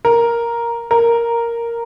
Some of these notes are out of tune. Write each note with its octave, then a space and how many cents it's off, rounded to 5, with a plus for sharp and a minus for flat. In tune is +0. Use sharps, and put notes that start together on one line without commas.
A#4 +5
A#4 +0